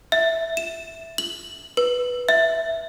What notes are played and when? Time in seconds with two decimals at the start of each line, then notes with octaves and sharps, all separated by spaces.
0.12 E5
0.57 E7
1.18 F#7
1.77 B4
2.29 E5